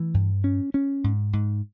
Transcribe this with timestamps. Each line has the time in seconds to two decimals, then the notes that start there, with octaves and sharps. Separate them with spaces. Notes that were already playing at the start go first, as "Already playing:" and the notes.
Already playing: E3 A3
0.14 G2
0.44 C#4
0.74 C#4
1.04 G#2
1.33 G#2